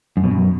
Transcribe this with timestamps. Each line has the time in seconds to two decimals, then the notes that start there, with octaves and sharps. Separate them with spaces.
0.17 F#2
0.24 B2
0.31 F#2